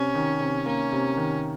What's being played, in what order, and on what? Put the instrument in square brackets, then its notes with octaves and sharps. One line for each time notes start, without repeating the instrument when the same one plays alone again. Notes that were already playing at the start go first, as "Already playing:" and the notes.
Already playing: [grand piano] C3 [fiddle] C#4
[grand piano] D#3
C3
[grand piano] A#3 [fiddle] C#4
[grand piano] C3
D#3